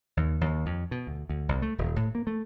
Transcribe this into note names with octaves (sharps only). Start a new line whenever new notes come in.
D#2
D#2
F2
B2
D2
D2
C2
A3
D#1
A2
A#3
A3